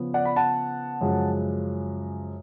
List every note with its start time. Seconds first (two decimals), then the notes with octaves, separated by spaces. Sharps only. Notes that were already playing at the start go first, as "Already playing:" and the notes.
Already playing: C#3 F3 B3
0.14 D5 F#5
0.25 B5
0.36 F#5 A5
1.01 F#2 C#3 F3 G#3